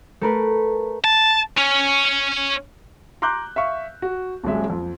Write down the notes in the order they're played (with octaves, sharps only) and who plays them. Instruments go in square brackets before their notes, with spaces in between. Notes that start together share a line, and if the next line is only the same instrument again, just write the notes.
[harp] A3 A#4 B4
[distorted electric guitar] A5
C#4
[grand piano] A#5 C6 D6 F#6 G6
E5 F5 C#6
F#4
D#1 F#3 G#3 E5
F2